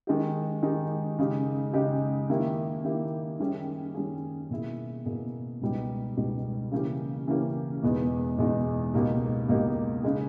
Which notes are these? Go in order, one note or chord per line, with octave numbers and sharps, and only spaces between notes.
D#3 G#3 D#4 G4
D#3 G#3 D#4 G4
C#3 G#3 D#4 G4
C#3 G#3 D#4 G4
D#3 A#3 E4 G4
D#3 A#3 E4 G4
D#3 G3 C#4 G#4
D#3 G3 C#4 G#4
B2 A#3 E4 G#4
B2 A#3 E4 G#4
C#2 B2 G3 B3 D#4
C#2 B2 G3 B3 D#4
C#3 E3 A#3 C#4 G4
C#3 E3 A#3 C#4 G4
E2 B2 G#3 B3 D#4
E2 B2 G#3 B3 D#4
C#2 B2 A#3 D#4 G4
C#2 B2 A#3 D#4 G4
C#3 G#3 D#4 G#4